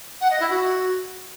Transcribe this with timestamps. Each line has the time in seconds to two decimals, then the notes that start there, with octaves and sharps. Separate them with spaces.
0.21 F#5
0.30 D#5
0.40 E4
0.50 F#4